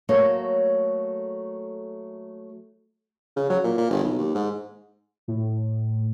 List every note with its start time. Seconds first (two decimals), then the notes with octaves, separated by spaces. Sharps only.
0.09 F#3 A3 A#3 A4 C#5
3.36 C#3
3.50 F#3
3.64 A#2
3.78 A#2
3.91 G1
4.03 B1
4.19 D#2
4.35 G#2
5.28 A2